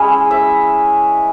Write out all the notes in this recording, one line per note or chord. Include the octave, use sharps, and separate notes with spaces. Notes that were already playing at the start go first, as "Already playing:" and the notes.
Already playing: G#3 C#4 E4
E5